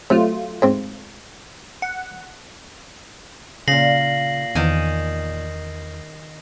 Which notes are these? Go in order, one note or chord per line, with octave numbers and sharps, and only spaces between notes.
C3 F#3 A3 F4
G#2 C4
F#5
A#2 C#3 F5 A#6 C7 F#7
E2 D#3 G#5